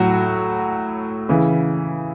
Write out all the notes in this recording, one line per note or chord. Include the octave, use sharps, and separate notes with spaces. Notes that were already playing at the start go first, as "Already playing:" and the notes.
Already playing: A2 F#3 F#4
C#3 E3